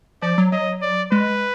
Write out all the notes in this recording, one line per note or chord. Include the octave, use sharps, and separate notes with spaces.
F3 D5
F#3
F#3 D#5
D5
G#3 B4